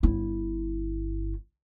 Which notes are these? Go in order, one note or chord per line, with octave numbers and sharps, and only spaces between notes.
G1 E4